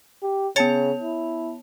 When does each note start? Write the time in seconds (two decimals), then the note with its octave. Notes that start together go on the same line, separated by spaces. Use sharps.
0.22 G4
0.56 C#3 B3 C#5 A5 A6 C#7 F7
1.02 E4